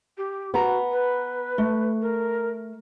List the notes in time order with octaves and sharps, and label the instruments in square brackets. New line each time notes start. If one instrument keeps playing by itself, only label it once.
[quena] G4
[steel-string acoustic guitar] B3 A#5 [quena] F#4
[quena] B4
[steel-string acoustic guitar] A3
[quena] A#4